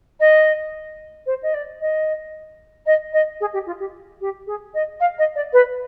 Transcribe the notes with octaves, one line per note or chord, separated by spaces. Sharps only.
D#5
C5
D#5
D5
D#5
D#5
D#5
G#4
G4
F4
G4
G4
G#4
D#5
F5
D#5
D5
B4